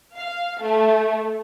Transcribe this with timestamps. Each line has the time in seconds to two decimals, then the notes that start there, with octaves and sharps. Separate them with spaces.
0.16 F5
0.61 A3